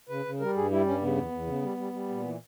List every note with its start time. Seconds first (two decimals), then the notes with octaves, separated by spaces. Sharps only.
0.09 C#3 B4
0.25 C#3
0.40 G3 A#4
0.55 G2 G#4
0.71 G3 E4
0.86 G2 C#4
1.01 C#3 B3
1.17 E2
1.32 E2
1.47 C#3
1.62 G3
1.77 G3
1.93 G3
2.09 A#2
2.23 E3